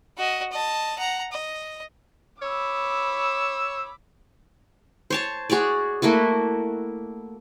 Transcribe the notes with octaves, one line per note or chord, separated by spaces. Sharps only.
F#4 D#5
D#5 A5
F#5 A#5
D#5
C#5 B5 D6 E6
C5 C#5 A5
F#4 G#4 C#5 D5
A3 A#3 E4 F#4